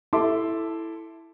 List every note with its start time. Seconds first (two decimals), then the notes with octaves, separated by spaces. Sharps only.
0.13 E4 A4 E5 A5 C6 D6